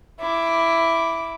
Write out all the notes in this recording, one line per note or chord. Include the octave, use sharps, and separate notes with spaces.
E4 D6